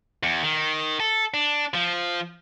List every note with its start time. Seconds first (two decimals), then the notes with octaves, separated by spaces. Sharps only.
0.23 E2
0.43 D#3
1.00 A4
1.34 D4
1.74 F3